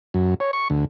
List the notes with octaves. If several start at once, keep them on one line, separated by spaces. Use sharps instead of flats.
F#2
C#5
C#6
D2